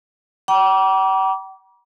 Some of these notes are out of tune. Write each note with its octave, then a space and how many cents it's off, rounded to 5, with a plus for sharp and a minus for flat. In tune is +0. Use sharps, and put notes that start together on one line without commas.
G5 -45 A#5 +45 D6 -25